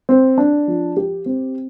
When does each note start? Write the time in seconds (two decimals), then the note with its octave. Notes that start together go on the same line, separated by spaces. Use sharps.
0.09 C4
0.38 D4
0.68 F3
0.97 G4
1.26 C4